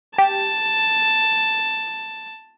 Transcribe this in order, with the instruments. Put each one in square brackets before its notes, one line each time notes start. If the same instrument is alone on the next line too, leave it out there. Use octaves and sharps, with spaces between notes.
[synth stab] G4 [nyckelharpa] A5